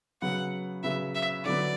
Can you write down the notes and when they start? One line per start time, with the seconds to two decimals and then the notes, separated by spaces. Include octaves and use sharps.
0.22 C#3 F#3 B3 F#5
0.83 C#3 F#3 B3 E5
1.15 E5
1.45 D3 F#3 B3 D5